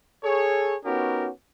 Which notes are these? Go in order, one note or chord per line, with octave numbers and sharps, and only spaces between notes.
G#4 A4 C#5
B3 C#4 D#4 F#4 G4 A#4